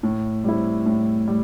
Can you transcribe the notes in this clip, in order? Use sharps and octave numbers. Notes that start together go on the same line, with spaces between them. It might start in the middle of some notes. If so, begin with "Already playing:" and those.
A2
G3 C4 E4
A2
G3